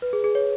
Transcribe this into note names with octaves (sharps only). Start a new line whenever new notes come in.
B4
G#4
G#4
C#5